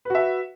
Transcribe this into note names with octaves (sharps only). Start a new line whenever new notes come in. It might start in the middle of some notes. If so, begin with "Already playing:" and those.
F#4 B4 E5